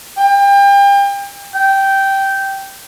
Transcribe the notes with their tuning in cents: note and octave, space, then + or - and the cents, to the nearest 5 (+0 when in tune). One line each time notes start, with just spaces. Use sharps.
G5 +35
G5 -10